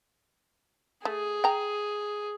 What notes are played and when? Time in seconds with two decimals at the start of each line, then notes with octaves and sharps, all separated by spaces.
1.05 A3 G#4
1.44 G5 A#5